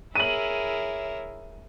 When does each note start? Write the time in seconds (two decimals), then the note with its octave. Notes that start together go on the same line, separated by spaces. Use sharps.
0.15 E4 G#4 A#4 C#5 E5 D#7 F#7